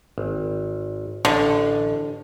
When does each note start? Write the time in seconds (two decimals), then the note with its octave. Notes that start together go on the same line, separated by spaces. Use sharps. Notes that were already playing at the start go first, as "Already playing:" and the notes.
0.18 G#1
1.25 A1 D3